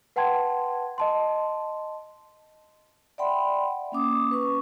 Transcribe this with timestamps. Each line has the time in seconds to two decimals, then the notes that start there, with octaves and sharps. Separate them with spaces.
0.16 B4 F#5 G5 A5 C6 G#6
0.98 D#5 A5 C6
3.18 D5 E5 F#5 G5 B5 C6
3.92 A#3 C#4 D6 D#6
4.31 B4 C#6